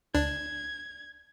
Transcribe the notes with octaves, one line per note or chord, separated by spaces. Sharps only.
D2 D4 G#6